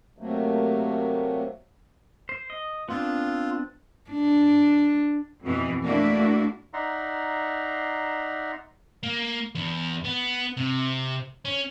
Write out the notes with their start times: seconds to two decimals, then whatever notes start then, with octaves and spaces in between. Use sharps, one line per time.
0.18 C3 F#3 A3 A#3
2.29 C5
2.50 D#5
2.89 B3 C4 D4 F4
4.10 D4
5.42 F2 B2 E3
5.83 A3 A#3 D4 E4 F#4
6.73 D#4 D5 E5 F#5 A#5 C6
9.03 A#3
9.55 E2
10.05 B3
10.57 C3
11.45 C#4